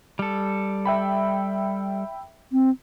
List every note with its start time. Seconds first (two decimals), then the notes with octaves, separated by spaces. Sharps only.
0.19 G3 A4
0.85 E5 G5 B5
2.52 C4